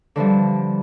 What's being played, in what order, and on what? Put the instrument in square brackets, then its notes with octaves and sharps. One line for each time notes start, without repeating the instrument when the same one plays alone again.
[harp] D3 E3 F3 G3